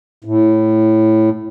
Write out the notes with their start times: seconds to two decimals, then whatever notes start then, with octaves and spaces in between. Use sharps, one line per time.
0.25 A2